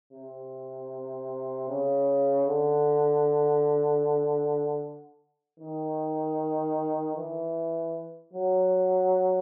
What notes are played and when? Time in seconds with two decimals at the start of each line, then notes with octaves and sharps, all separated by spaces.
0.13 C3
1.69 C#3
2.47 D3
5.60 D#3
7.16 E3
8.33 F#3